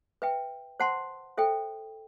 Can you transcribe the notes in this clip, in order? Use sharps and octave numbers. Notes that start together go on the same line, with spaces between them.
B4 E5 G5
C5 F#5 A5 C6
A4 C5 E5 G5